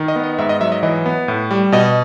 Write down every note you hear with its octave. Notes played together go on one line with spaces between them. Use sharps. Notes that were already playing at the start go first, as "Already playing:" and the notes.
Already playing: D#3
D#5
B3
D#5
G#2 E5
D#5
F#3 E5
D#5
E3 D#5
B3
A2
G3
B2 D#5